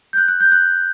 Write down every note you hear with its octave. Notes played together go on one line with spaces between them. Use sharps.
G6
F#6
F#6
G6
F#6